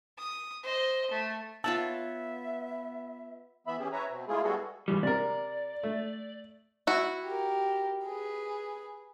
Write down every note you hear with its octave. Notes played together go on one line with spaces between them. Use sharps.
D#6
C5 D#5
A3
B3 F4 C#5 E5 F#5 A5 E6
E3 B3 E5 B5
E3 C#4 G4 G#4
B4 C#5 E5 A#5
B2 C4
G#3 A3 E4 F4 G#4
G3 B3 F#4 G#4 A4
G#2 E3 G3
C3 A#4 D5
A3
E4 F#4
G4 A#4
G#4 B4